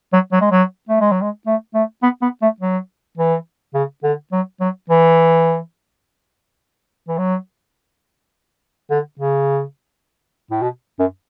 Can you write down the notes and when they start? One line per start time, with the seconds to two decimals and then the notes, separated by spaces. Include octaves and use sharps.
0.13 F#3
0.32 F#3
0.41 G#3
0.51 F#3
0.89 A3
1.01 G#3
1.12 F#3
1.22 G#3
1.46 A3
1.74 A3
2.03 B3
2.22 B3
2.42 A3
2.60 F#3
3.18 E3
3.74 C#3
4.04 D3
4.32 F#3
4.60 F#3
4.90 E3
7.08 E3
7.18 F#3
8.90 D3
9.19 C#3
10.51 A2
10.62 B2
10.99 F#2